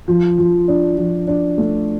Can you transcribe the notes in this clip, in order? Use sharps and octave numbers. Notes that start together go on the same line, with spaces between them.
F3
F3
D4
F3
D4
A3